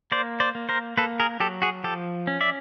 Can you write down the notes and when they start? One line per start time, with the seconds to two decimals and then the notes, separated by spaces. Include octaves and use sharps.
0.12 A#3 C5 D5
0.40 C5 D5
0.55 A#3
0.69 A#4 C5
0.97 A#3 A4 B4
1.20 G#4 A#4
1.40 F#3 G4 A4
1.62 F#4 G#4
1.84 F3 G4 A4
2.27 C#4
2.41 D5 E5